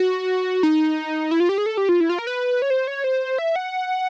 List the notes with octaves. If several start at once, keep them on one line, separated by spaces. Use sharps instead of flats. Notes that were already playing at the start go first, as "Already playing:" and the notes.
Already playing: F#4
D#4
E4
F4
G4
G#4
A4
G4
F4
E4
F4
A#4
B4
C#5
C5
C#5
C5
E5
F#5